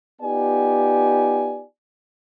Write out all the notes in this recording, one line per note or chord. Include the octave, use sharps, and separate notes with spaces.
B3 D#4 F4 G4 D5 G#5